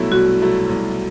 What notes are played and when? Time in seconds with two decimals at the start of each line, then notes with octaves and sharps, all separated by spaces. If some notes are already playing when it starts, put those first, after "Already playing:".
Already playing: C2 B2 F#3 A3 E4
0.11 C2 F#4
0.40 B2 F#3 A3 E4
0.69 C2